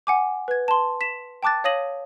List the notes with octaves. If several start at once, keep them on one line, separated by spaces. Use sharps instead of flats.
F#5 G#5 D6
B4 G#6
A5 C6
B6 E7
G5 A5 D6 F#6 A6
C#5 F5 D#6 A#6 D#7 F#7